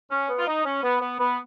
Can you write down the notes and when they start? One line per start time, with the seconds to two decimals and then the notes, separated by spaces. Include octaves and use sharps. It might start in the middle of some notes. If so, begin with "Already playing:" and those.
0.11 C#4
0.29 B3
0.39 F4
0.47 D#4
0.65 C#4
0.83 B3
1.01 B3
1.20 B3